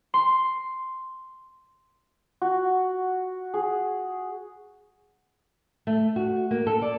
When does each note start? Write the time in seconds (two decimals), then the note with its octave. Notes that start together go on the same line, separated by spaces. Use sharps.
0.14 C6
2.42 F#4
3.54 G#4
5.87 A3
6.16 F#4
6.51 A#3
6.67 A4
6.82 D5